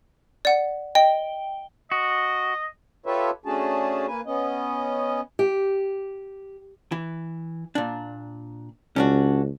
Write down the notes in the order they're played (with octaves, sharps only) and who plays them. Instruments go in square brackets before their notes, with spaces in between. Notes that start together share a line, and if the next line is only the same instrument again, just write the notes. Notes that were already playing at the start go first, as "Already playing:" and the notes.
[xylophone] D5 F#5
[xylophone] D#5 [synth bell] G5
[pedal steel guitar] F#4 [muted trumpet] D#5
[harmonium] F4 G4 A4 B4 C#5 E5
A3 C#4 D4 F#4 G#4 A5
A#3 B4 G#5
B3 C#4 D#5
[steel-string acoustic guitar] G4
[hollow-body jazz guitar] E3
A#2 D4
[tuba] C#2 [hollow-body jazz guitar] C#4 D4 F#4